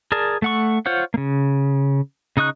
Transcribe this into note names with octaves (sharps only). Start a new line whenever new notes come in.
G#4 A#4 D5 A5
A3 F#5 C#6
F4 C5 C#5 F#5
C#3 A#3
C#3 D#4 D#5 C#6 F#6